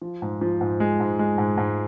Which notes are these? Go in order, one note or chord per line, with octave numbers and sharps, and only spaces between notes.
F3
G#2
F3
G#2
G#3
G#2
G#3
G#2
G#2